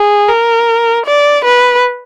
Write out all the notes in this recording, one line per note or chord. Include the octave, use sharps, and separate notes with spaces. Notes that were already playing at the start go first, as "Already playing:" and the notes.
Already playing: G#4
A#4
D5
B4